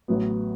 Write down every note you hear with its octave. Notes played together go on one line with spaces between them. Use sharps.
A1 A2 F#3 B3 F#4